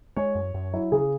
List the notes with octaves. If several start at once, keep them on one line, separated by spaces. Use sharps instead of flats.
G#3 C#5
F#2
F#2
F#3 E4
C#3 G#4